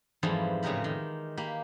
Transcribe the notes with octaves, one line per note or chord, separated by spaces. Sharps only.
F2 G#2 E3 F3 G3
A2 C#3 G#3 G4 A#4 B5
D#3
A#3 G4 B5